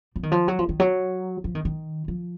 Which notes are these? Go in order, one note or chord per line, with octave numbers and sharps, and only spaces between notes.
F3
D#3
F3
F#3
F3
D#3
F#3
F3
D#3
D#3
F3